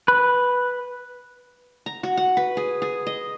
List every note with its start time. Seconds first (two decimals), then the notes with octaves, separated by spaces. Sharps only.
0.08 B4
1.86 A#5
2.03 F#4
2.17 F#5
2.37 B4
2.57 G#4
2.82 G#4
3.07 D#5